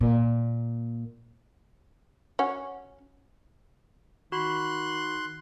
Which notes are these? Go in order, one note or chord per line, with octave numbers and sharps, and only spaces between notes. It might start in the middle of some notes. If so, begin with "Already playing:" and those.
A#2
C#4 F#4
D#3 F#4 B5 C6 F#6